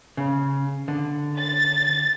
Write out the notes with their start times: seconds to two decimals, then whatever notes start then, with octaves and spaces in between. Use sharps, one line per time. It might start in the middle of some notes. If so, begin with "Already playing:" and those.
0.17 C#3
0.88 D3
1.38 A6